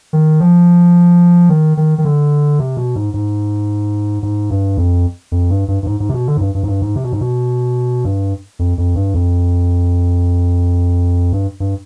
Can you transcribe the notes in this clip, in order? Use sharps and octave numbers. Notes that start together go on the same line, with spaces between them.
D#3
F3
D#3
D#3
D#3
D3
C3
B2
G#2
G#2
G#2
G2
F2
F2
G2
G2
G2
G#2
G#2
C3
B2
D3
G#2
G2
G2
G#2
G2
G#2
C3
B2
G#2
B2
G2
F2
F2
G2
F2
G2
G2